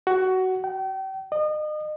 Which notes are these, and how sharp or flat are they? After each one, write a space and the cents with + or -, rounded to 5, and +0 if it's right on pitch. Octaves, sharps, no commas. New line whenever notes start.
F#4 +15
G5 -35
D#5 -35